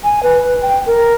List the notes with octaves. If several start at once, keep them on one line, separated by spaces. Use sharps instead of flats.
G#5
B4
G5
A#4